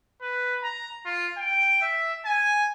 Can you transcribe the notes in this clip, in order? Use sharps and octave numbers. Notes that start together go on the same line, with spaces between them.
B4
A#5
F4
G5
E5
G#5